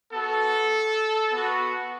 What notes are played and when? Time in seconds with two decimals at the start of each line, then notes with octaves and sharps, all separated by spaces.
0.12 B3 F#4 A4
1.32 B3 F#4